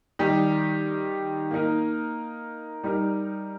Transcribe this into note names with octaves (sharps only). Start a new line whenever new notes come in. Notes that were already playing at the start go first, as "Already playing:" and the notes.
D#3 G3 D#4 G4
A#3 D#4 A#4
G3 D#4 A#4